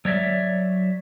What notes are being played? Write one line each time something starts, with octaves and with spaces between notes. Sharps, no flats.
F#3 C#5 D5 E5